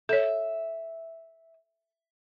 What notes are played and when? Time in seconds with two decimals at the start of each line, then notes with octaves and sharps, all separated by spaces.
0.09 A4 C#5 E5